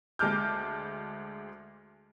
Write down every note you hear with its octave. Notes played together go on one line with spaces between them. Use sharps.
D2 G#3 A5 D6 F6 G6